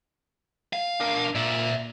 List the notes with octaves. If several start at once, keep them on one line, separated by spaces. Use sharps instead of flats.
F5
D4 A#4
A#2 D5 E5